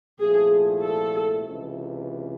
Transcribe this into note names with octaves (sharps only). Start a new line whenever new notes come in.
C2 A#2 F3 A3 G#4
A4
C#2 C3 E3